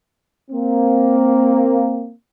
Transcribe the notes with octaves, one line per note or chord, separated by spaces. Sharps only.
A#3 C4